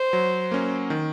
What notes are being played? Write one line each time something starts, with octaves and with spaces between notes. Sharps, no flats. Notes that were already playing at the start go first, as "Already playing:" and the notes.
Already playing: C5
F#3
A#3 C#4
D#3